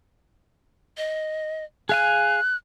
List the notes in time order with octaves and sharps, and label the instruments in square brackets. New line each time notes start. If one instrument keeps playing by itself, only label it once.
[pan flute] D#5
[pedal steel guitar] G#4 F5 G#5 [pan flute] F#6